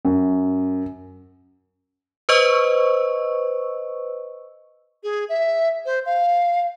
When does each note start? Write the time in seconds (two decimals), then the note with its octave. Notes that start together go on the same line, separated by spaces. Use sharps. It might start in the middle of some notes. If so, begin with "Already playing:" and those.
0.05 F#2
2.29 B4 C5 D#5 C#6 E6
5.03 G#4
5.29 E5
5.86 C5
6.06 F5